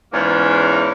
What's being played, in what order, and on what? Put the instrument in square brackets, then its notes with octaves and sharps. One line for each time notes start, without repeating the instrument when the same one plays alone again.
[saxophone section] E2 G#2 E3 A#3 C#4